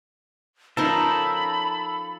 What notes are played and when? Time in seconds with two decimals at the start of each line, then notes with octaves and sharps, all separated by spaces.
0.77 F3 C#4 D#4 A4 A#4 C5 B5